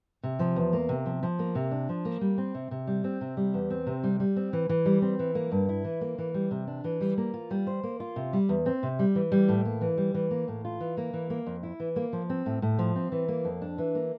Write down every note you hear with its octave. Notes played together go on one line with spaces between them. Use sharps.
C3
F3
E2
A#3
C3
F3
F3
A#3
C3
D4
F3
A#3
G3
C4
C3
C3
G3
C4
C3
G3
E2
C4
C3
G3
G3
C4
E3
E3
G3
C4
E3
A#3
G2
E4
E3
A#3
E3
G3
C3
D4
E3
G3
A#3
F4
G3
C5
A#3
F4
C3
G3
E2
C4
C3
G3
E3
G3
A2
A#3
E3
G3
E3
A#3
A2
F4
E3
A#3
E3
A#3
F2
E4
E3
A#3
F3
C4
A2
A2
F3
C4
E3
A#3
F2
D4
E3
A#3